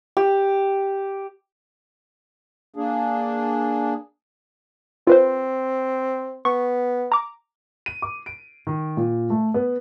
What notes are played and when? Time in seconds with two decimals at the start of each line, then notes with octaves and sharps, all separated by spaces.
0.17 G4
2.76 A#3 D4 G#4
5.07 C4 F4 B4 C5
6.45 B3 C#6
7.12 A#5 D6
7.86 D#7
8.02 D6
8.26 D7
8.67 D#3
8.97 A#2
9.30 A3
9.54 B3